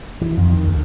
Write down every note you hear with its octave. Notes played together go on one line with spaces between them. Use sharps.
E3
F2
D#3
D2